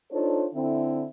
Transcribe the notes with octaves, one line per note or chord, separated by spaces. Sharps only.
D4 D#4 F4 A4 C5 C#5
D3 C4 E4